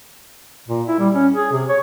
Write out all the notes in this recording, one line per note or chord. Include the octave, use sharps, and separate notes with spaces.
A#2
E4
G3
C#4
G#4
C3
C#5